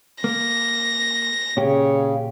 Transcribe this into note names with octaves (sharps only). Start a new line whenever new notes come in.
A#3 A#6
A#2 C#3 G4 C#5